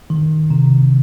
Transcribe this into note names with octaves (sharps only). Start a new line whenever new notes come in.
D#3
C3